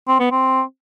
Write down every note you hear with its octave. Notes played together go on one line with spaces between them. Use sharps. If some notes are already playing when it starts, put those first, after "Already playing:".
C4
B3
C4